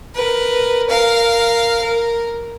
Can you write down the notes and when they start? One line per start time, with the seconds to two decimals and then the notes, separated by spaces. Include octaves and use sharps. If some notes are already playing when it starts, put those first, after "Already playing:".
0.15 A#4 B4
0.89 A#4 F5
1.82 A#4